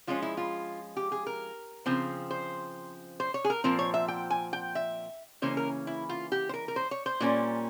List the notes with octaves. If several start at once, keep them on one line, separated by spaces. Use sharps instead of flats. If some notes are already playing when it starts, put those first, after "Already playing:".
F3 G#3 C#4 F4
E4
F4
G4
G#4
A#4
C#3 F3 C4
C5
C5
C#5
G#4
A#4
A#2 F3 C4 A#4
C#5
E5
G5
G#5
G5
E5
C#3 E3 A#3 C#4 C5
A#4
E4
F4
G4
C5
A#4
A#4
C5
C#5
C5
A#2 G3 A#3 C#4